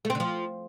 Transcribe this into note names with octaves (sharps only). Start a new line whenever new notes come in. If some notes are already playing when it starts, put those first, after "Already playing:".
A3
C4
D3
F3